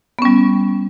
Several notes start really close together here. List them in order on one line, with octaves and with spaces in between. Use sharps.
B3 C#4 G3